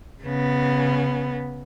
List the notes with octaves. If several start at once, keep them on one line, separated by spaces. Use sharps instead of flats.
C#3 B3